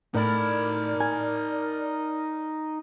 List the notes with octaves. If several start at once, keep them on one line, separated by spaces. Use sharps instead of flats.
A2 D#4 A#4 D5 B5 F6
G#5